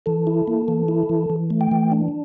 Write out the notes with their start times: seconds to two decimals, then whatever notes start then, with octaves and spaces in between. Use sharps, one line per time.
0.06 E3 A4
0.27 E4
0.48 A#3
0.68 E3
0.88 E4
1.09 E3
1.30 E3
1.50 A3
1.61 G5
1.71 E3
1.92 D4